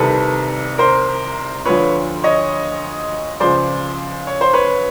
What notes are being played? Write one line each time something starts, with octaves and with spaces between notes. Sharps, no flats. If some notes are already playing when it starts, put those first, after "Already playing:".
Already playing: C2 C3 D#3 A4 B4
A#4 C5
D2 D3 F3 B4 C#5
C#5 D#5
C#2 C#3 F3 C5 D5
C#5
C5
B4 C#5